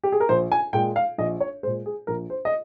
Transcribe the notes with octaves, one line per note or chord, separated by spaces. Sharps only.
G4
G#4
A#4
A#1 C5
G#5
A#2 G#3 G5
F5
A#1 D#5
C#5
A#2 G#3 C5
G#4
A#1 A#4
C5
D#5